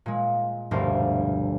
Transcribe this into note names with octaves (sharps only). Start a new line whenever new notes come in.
A#2 G#3
F1 D2 G2 B2 A#4 C5